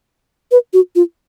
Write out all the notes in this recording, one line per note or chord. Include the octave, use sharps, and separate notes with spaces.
B4
F#4
F4